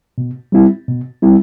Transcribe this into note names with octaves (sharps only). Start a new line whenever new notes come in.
B2
G3 C4 E4
B2
G3 C4 E4